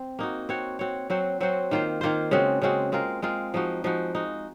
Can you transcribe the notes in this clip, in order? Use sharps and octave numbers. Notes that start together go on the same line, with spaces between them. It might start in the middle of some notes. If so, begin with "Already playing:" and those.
Already playing: C4 C5
A#3 D#4 F#4
C4 F#4 C#5
C4 F#4 C#5
F#3 C4 F#4 C5
F#3 C4 F#4 C5
D#3 A#3 F4 C5
D#3 A#3 F4 C5
C#3 G#3 C4 F#4
C#3 G#3 C4 F#4
G#3 C4 F4 A#4
G#3 C4 F4 A#4
F3 G#3 D#4 F#4
F3 G#3 D#4 F#4
G#3 D#4 F#4